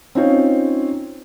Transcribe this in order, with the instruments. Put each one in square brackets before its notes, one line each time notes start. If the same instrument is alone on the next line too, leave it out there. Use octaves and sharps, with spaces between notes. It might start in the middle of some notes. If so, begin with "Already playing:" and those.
[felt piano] C4 C#4 D#4 F4 C5 C#5